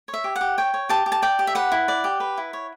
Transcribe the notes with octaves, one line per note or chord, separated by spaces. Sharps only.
C#5
E5
G4
F#5
G4
C#5 G5
C#5
G4 A5
G4
A5
D5 G5
G4
E5
B4 F#5
E4
D5
G4
B4
E4
C#5